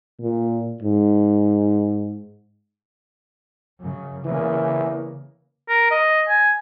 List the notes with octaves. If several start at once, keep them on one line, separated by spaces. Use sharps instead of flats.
A#2
G#2
F#2 C#3
C#3 E3 A#3
A#4
D#5
G#5